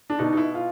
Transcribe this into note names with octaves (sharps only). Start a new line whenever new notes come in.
D4
B2 D#4
D#4
E4
F4